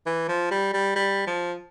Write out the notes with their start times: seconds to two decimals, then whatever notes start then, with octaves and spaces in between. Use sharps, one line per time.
0.06 E3
0.29 F3
0.51 G3
0.74 G3
0.96 G3
1.27 F3